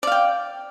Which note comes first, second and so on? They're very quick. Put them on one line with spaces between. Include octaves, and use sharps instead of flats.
D5 F5 G5